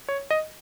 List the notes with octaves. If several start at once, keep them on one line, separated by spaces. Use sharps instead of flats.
C#5
D#5